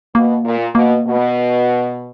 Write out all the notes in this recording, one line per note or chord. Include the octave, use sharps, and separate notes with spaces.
B2 A#3
A#2
B2 A#3
B2